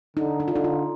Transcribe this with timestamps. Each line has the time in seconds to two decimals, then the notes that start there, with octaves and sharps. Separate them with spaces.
0.16 D3 D#4
0.40 D#4
0.48 F4
0.52 D3 D#4
0.64 F4